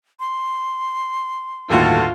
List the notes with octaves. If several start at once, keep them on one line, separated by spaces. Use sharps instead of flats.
C6
G1 D#2 A2 F4 F#4 A4